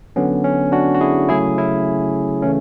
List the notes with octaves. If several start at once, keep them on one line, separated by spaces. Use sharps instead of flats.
D3 F#3 B3 C#4
C#4
D4 F#4
F#4
E4 G#4
C#3 F#3 A3 E4 G#4
C#4 E4
C#3 E3 A3 C#4